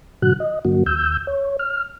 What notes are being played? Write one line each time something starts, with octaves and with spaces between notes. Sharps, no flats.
G#2 B2 D3 F#3 F#4 F#6
D#5
G2 D3 F#3 A#3 F#4
D#2 E6 G6
C#5
F6